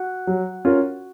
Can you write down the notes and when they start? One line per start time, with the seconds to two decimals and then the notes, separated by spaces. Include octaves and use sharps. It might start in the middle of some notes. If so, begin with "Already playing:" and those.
Already playing: F#4
0.27 F#3
0.65 C#4 F4 A#4